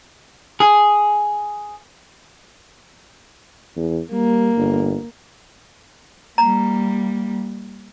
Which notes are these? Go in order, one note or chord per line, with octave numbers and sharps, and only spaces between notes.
G#4
E2
G3 A#3
G1
G3 A#3 A#5